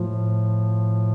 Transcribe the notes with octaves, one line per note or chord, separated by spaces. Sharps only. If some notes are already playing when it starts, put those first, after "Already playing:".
Already playing: A2 F3